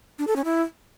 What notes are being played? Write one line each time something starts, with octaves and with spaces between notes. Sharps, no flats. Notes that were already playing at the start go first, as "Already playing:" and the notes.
D4
A4
C#4
E4